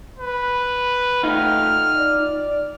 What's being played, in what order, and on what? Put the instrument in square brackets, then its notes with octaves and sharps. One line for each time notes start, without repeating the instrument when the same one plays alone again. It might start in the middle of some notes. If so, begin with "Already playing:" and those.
[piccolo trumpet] B4
[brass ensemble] A3 G5 [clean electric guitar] D#4 F4 [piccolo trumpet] F6
[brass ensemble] D5